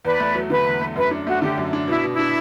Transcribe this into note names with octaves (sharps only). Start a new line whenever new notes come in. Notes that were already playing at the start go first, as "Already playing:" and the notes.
E2 B4 D5
A3
F#3
D3 B4
E2
A3
F#2 B4
D4
A3 F#4
D3 G4
F#2
D4
B2 E4
B2
E4
D4